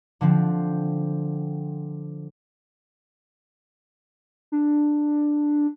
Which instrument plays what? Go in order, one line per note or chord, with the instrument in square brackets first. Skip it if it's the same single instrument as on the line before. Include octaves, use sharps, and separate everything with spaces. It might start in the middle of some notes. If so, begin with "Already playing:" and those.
[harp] D3 F3 C4
[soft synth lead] D4